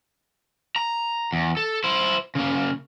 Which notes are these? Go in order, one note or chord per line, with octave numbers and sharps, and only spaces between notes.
A#5
E2
A4
E4 C5
C#3 A#3